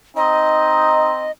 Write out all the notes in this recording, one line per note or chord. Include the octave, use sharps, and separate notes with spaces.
C4 D#4 D#5